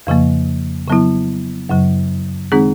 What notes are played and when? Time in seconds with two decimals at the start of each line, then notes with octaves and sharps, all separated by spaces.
0.07 F2 C#3 F3 A#3
0.88 C#3 F#3 B3 E4
1.69 F#2 C#3 F#3
2.52 D#3 G#3 C4 D#4 G#4